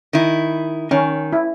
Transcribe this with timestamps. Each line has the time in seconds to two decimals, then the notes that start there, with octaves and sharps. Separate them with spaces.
0.13 D#3 E4
0.91 D#3 C#4
1.33 E4